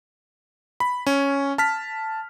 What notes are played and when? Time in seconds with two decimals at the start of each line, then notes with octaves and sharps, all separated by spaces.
0.80 B5
1.07 C#4
1.58 A5 F6 B6